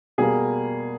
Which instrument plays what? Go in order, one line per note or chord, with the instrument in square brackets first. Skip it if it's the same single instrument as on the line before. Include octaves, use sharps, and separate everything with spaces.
[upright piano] B2 G3 A#3 G#4